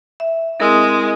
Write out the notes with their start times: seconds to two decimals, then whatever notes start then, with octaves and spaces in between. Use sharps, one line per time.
0.20 E5
0.60 G#3 C4 E4 A#4